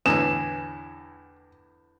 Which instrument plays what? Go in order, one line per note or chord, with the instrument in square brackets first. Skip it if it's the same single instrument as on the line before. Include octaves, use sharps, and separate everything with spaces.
[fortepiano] E2 A2 D3 [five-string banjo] G#4 B4 [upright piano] E7